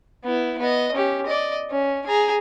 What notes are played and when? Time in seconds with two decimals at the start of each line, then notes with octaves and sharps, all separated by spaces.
0.24 B3 E4
0.59 B3 D#5
0.93 C#4 G4
1.26 D5 D#5
1.70 C#4
2.07 G#4 A#5